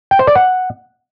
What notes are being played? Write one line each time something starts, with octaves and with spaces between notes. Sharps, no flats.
G5
C5
D5
F#5